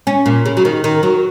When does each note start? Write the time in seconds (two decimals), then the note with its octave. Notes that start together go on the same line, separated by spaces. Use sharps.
0.07 C#4
0.26 A#2
0.46 C#3
0.57 F#3
0.65 D#3
0.84 D#3
1.03 F#3